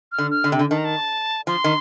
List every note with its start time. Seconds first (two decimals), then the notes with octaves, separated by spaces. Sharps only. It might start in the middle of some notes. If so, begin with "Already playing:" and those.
0.12 F6
0.18 D3
0.31 F6
0.44 D3
0.52 C3
0.59 D3
0.71 D#3 A5
0.78 A#5
0.85 A5
1.47 F3 C6
1.64 D#3